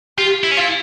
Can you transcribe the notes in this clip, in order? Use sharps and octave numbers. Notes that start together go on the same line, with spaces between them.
F4 G4
E4
C#4
E4 F4